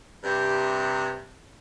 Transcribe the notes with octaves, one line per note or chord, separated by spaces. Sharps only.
G2 C3